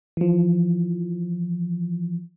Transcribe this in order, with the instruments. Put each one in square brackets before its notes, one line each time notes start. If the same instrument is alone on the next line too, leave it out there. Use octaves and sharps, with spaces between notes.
[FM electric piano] E3 F3